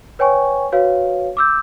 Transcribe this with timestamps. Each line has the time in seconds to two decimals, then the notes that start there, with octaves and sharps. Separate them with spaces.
0.19 B4 C#5 G5 G#5 C#6
0.72 F#4 B4 C#5 F5
1.37 D6 E6 G6